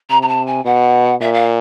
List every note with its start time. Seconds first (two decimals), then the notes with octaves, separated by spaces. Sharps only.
0.10 C3 A#5
0.22 A#5
0.28 A5
0.47 G#5
0.65 B2 F#5
1.21 A#2 E5
1.34 F5